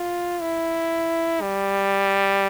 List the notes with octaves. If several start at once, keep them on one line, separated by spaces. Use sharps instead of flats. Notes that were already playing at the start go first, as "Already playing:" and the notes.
Already playing: F4
E4
G3